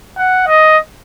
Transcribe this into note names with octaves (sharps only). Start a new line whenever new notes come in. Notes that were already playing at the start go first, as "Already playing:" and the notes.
F#5
D#5